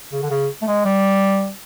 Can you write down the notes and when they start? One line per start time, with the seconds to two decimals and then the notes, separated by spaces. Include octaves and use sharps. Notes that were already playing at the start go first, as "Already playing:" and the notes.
0.12 C#3
0.22 D3
0.30 C#3
0.62 A3
0.67 G#3
0.85 G3